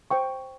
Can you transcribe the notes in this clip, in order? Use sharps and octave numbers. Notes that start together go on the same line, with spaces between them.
C5 G5 C#6